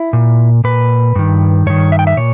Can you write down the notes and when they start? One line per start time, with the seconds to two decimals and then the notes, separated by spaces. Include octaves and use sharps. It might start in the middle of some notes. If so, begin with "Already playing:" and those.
Already playing: E4
0.13 A#2
0.64 A#2 B4
1.15 G2 D#3
1.66 G2 D#3 C#5
1.92 E5
1.99 G5
2.07 E5
2.17 A#2 C#5